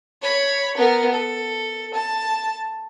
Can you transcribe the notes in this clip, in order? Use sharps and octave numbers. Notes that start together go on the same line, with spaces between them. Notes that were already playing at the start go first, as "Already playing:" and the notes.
C#5 B5
B3 A#4
A4
A5